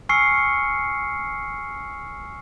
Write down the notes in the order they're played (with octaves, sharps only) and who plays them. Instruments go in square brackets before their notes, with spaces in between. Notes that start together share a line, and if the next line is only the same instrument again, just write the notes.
[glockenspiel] G#5 C#6 E6 F6 C7 C#7